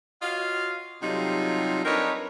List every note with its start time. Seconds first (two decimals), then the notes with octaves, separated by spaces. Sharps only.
0.22 F4 F#4 C#5 D#5 F5
1.03 C3 F#3 G3 D#4 F4 A4
1.85 C4 D4 D#4 A#4 B4 C#5